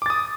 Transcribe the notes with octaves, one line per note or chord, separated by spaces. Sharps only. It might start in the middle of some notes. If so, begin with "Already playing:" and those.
D6 D#6 A6